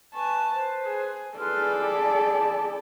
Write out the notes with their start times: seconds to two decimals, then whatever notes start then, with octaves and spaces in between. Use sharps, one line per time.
0.14 B4 G#5 A5 C#6
0.52 B4 C5
0.85 G#4
1.38 G#4 A4 B4 D5 C6 F6
1.80 G4 A5 B5